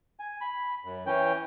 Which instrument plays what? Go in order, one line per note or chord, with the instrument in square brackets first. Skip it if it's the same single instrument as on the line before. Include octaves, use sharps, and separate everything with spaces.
[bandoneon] G#5
B5
F#2
E3 C#4 G5